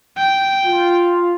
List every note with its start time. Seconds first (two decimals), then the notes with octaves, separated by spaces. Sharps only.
0.17 G5
0.65 F4